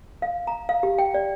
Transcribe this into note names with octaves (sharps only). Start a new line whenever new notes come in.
F5
A#5
F5
G4
G5
D5